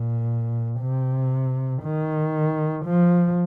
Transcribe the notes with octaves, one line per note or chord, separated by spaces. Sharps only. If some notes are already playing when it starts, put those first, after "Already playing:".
Already playing: A#2
C3
D#3
F3